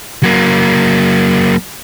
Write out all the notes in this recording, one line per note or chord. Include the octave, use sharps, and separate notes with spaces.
F#3 A#3